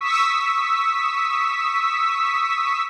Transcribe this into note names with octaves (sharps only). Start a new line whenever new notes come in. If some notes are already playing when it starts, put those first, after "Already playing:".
C#6 D#6 E6 B6